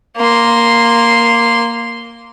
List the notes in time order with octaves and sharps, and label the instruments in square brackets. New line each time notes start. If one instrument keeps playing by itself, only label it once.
[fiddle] A#3 C6